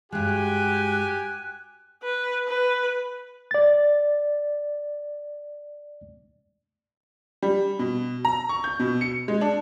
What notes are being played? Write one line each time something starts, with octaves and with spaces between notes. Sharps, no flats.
G2 G#3 F#4 G4 G#5 F#6
B4
B4
D5 A6
G3
B2
A#5
C#6
G6
B2
C#7
G#3
D4